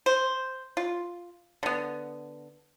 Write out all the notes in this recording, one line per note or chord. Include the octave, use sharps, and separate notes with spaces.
C5
F4
D3 B3